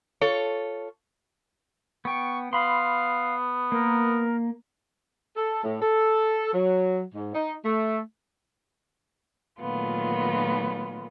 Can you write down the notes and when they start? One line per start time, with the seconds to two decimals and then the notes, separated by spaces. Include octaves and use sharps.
0.21 F4 A4 C#5
2.05 B3 G5 C#6
2.53 B3 F5 B5 C6
3.72 A#3 A#4
5.36 A4
5.64 A2
5.82 A4
6.53 F#3
7.15 G#2
7.35 D#4
7.64 A3
9.59 A#2 D#3 F#3 A3 B3 F4